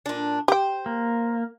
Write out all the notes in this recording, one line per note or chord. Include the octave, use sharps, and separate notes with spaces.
A#2 D4
G4 C5 G5
A#3